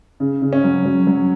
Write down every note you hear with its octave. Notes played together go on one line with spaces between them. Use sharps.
C#3
C#3
C#4
F#3
F#3
F#3